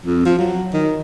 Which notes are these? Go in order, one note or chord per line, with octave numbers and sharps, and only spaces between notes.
F2
F3
F#3
D#3